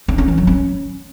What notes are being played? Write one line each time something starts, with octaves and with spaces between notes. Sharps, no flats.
D4
C#4
E3
F#3
C#4